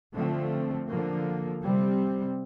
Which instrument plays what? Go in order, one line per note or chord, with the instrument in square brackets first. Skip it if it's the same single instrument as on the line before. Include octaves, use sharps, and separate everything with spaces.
[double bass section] D3 F3 A3 C4
D3 F3 A#3
C3 G3 C4